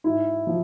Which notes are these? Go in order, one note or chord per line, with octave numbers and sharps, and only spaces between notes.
G#2 E4
F3